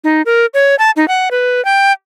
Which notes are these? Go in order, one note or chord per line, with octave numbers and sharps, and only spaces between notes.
D#4
A#4
C#5
A5
D#4
F#5
B4
G5